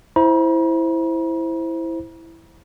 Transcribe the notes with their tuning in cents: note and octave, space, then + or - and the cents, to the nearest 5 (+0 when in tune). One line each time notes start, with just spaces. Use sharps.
E4 +0 C5 +0 A#5 +45